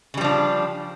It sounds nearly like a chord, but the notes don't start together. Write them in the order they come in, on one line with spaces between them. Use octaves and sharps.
C#3 G3 F3 D4